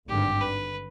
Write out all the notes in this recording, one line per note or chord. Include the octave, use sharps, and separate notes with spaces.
G#1 G2 D3 G4
B4